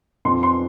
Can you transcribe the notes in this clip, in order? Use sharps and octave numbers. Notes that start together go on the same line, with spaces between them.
F2 C6
C6